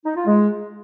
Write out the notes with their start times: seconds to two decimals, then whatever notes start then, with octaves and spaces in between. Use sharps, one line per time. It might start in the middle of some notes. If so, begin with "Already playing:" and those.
0.05 D#4
0.16 F4
0.26 G#3